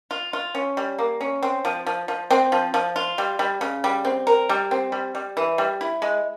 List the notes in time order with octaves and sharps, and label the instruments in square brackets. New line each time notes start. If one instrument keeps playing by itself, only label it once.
[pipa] F4
F4
C#4
G3
A#3
C#4
C4
F3
F3
F3
C4
F3
F3
F4
G3
G3
C#3
G3
C4
A#4
G3
C4
G3
G3
E3
G3
E4
G#3